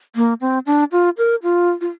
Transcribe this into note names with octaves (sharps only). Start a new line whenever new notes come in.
A#3
C4
D4
F4
A#4
F4
F4